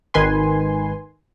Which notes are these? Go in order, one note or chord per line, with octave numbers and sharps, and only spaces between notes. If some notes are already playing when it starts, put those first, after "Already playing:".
G#1 D#3 B4 G#5 C6